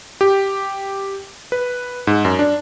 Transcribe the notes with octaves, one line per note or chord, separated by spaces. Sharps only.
G4
B4
G#2
F#2
D4